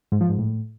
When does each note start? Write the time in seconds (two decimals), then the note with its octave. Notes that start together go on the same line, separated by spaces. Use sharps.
0.12 G#2
0.21 F3
0.29 G#2
0.38 A2